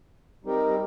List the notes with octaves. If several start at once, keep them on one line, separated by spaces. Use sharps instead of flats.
G3 C4 D#4 G4 A#4